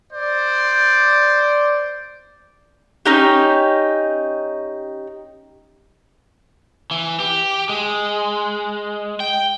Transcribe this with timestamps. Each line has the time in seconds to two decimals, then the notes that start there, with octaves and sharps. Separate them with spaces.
0.13 C5 D5
3.06 C#4 D#4 G4
6.91 E3
7.20 G4
7.69 G#3
9.20 G5